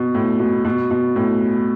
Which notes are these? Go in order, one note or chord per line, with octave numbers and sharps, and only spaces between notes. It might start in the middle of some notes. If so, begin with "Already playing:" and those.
Already playing: B2
A2
B2
B2
B2
A2